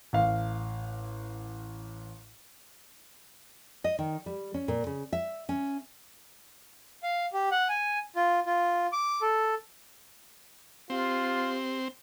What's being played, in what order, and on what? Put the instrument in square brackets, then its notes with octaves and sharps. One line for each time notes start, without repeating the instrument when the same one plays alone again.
[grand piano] A1 F5
[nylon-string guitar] D#5
D#3
G3
C#4
A#2
C#3
E5
C#4
[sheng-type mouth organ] F5
G4
F#5
G#5
F4
F4
D6
A4
[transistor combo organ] C4 [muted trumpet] F4 [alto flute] G4